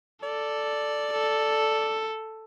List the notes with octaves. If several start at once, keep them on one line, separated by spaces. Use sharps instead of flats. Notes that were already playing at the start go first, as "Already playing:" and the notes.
A4 D5
A4